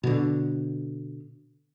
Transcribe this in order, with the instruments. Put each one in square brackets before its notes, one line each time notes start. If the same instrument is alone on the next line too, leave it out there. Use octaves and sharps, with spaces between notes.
[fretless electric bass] B2 D3